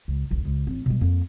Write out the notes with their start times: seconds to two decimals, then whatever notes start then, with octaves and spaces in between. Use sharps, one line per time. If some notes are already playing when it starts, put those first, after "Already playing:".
0.08 C#2
0.31 D#1 A#1
0.45 C#2
0.67 A1 C4
0.86 B2 G3
1.01 F2 A#3